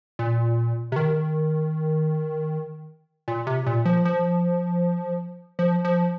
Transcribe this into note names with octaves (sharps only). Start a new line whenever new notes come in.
A#2
C3
D#3
A#2
C3
A#2
F3
F3
F3
F3